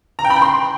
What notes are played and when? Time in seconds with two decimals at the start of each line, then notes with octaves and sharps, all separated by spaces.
0.19 A#5
0.25 G5
0.30 B5
0.36 G5
0.42 C6